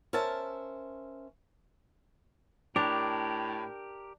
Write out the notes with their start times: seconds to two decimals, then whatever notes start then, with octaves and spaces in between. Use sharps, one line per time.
0.13 C#4 A#4 C5 E5 A5
2.76 A2 D4 G4 A#4